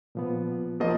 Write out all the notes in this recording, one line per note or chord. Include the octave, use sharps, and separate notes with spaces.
A#2 F3 B3
F3 A#3 D#5